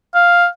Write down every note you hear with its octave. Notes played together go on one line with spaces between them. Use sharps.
F5